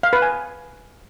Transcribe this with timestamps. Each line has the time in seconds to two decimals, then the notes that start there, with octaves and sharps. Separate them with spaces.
0.03 F5
0.13 B4
0.22 G#5